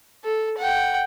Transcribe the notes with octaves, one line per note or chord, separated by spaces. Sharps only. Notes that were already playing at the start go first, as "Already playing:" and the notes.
A4
F#5 G5